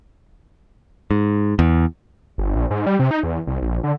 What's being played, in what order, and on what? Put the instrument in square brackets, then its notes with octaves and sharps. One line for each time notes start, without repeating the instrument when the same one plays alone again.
[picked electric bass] G#2
E2
[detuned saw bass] G1
A#1
G#2
G3
C3
D#4
E2
C2
A#1
D3